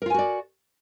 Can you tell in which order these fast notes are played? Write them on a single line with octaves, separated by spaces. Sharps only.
A#4 F4 G#5 F#4 D5